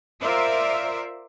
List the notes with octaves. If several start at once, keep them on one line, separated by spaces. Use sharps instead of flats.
F4 A#4 C5 D5 E5